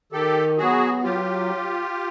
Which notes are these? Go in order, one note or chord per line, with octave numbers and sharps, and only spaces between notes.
D#3 G4 A4
F#3 B3 F#4 G#4
F#3 F4 G4